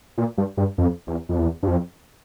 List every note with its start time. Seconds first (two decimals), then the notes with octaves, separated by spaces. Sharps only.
0.18 A#2
0.38 G2
0.57 G2
0.78 F2
1.07 E2
1.29 F2
1.38 E2
1.63 G2
1.68 F2